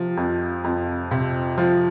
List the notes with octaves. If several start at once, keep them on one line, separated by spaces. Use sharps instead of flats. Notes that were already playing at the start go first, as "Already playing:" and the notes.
Already playing: C3 F3
F2
F2
C3
F3